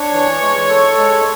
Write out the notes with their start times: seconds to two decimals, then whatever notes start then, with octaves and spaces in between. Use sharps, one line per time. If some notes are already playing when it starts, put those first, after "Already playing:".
Already playing: D4 C#5
0.13 E3
0.41 G#3
0.69 A4
0.97 G#3